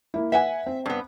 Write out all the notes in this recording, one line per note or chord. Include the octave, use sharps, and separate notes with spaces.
A#3 E4
B4 E5 F#5 G#5
C4
G2 B3